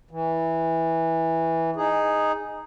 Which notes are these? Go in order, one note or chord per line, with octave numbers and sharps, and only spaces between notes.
E3
D#4 G#4